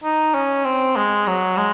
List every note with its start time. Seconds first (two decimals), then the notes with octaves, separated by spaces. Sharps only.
0.04 D#4
0.35 C#4
0.65 C4
0.96 G#3
1.27 F#3
1.57 G#3